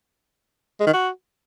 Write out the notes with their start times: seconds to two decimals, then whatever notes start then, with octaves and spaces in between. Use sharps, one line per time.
0.80 G#3
0.87 D#3
0.93 F#4